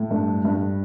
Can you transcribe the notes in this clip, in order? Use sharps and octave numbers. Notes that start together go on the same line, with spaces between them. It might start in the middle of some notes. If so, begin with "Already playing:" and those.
Already playing: A2
G2 A4
G2